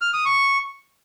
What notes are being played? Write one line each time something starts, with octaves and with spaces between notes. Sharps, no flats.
F6
D#6
C#6